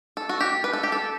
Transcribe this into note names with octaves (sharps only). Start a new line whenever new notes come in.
A4
F#4
G4
B4
A4
G4
A4